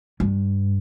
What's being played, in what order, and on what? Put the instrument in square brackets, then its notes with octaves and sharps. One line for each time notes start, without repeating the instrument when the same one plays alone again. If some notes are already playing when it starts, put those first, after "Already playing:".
[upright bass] G2